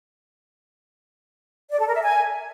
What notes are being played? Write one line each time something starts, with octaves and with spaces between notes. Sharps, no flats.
D5
A4
A#4
E5
G#5